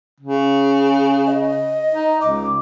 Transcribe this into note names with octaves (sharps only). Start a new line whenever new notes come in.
C#3
D#5
D#4
C#2 D6